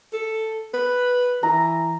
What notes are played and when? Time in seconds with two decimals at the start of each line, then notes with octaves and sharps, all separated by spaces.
0.13 A4
0.74 B4
1.43 E3 A#5